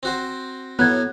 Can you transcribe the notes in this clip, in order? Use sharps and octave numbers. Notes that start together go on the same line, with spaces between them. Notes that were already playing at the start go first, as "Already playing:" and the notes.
C4 F#4 C5
A2 F#3 B3 F#6 G#6